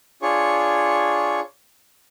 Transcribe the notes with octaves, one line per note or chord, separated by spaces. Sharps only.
D4 F4 G#4 C#5 C#6